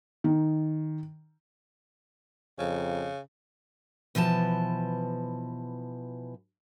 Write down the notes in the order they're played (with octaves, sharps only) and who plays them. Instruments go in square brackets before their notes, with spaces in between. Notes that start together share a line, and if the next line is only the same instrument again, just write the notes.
[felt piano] D#3
[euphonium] F2 [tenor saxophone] C#3
[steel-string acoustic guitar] B2 E3 F3 A4 A5